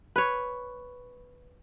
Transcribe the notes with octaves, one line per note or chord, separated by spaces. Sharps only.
B4 C#5